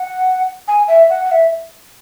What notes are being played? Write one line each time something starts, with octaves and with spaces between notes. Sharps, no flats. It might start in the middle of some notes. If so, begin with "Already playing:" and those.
Already playing: F#5
G#5
E5
F#5
F#5
E5